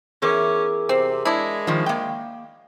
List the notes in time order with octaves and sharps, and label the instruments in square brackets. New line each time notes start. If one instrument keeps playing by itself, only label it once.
[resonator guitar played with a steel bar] E2 [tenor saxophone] C#4 [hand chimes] G#4 A#4 D6
[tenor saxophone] C3 [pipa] C4
[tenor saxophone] G#3 [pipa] D4 E4
[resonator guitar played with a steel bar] D#3 F3
A#3 G5